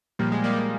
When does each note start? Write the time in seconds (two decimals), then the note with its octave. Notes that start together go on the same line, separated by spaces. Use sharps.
0.19 A#2 F3 G3 A#3
0.32 G#3
0.44 G3 A#3
0.56 G3 A#3